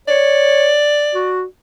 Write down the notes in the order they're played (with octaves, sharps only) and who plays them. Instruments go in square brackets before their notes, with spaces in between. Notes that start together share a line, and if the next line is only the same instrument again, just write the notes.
[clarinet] C#5 [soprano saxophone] D5
[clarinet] F#4